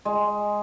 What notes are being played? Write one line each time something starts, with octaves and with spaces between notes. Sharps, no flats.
G#3